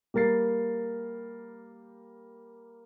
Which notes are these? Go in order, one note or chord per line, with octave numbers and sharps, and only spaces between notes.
G3 A#3 A#4 A6 C7